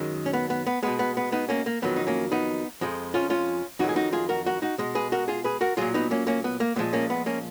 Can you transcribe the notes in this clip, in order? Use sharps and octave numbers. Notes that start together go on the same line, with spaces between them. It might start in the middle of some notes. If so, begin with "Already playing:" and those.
Already playing: F#2 D#3 G#3
C#4
B3
B3
B3
B2 G#3 B3
B3
B3
B3 D#4
A#3 C#4
A#3
F2 D#3 F#3 B3
D#4
A#3 C#4
B3 D#4
F2 F3 G#3
C#4 F4
C#4 F4
F2 D#3 F#3 D#4 F#4
G#4
D#4 F#4
F4 G#4
F#4 A#4
F#4 A#4
D#4 F#4
B2 G#3
G#4 B4
F#4 A#4
F4 G#4
G#4 B4
F#4 A#4
A#2 F#3 F4 G#4
B3 D#4
A#3 C#4
A#3 C#4
B3
A#3
A#2 F3 G#3 B3
A#3 C#4
B3
A#3 C#4